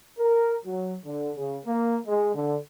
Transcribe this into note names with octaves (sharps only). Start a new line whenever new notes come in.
A#4
F#3
D3
C#3
A#3
G#3
D3